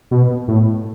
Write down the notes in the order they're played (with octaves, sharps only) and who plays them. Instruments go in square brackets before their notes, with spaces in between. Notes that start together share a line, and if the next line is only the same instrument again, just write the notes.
[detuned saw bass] B2
A2